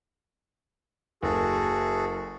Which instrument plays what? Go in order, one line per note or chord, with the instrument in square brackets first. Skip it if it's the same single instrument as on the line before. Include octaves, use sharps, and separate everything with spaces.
[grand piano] F#1 [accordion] F#4 G#4 A4